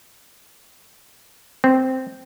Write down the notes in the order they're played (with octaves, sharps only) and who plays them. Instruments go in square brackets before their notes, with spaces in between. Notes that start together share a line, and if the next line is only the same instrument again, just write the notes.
[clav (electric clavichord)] C4